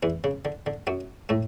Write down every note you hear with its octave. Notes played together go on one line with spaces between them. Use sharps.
E2 E3
C#3
D3
D3
F#2 F#3
A2 A3